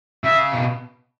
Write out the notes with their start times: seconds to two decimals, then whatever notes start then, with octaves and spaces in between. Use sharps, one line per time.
0.24 C#3 E5
0.52 B2